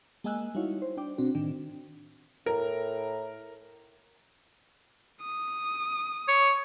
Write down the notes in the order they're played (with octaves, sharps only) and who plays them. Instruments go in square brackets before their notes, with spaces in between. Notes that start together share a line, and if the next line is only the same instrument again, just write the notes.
[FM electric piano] G#3 A#3 D#5 G#5 E6 F#6
G3 D#4 E4 F#4 C#5 F5
C5
D4 G5 D6
B2 C4 D4 F#4
A2 D#3 D4 G5
[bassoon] A2 [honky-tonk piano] A#4
[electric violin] D#6
[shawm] C#5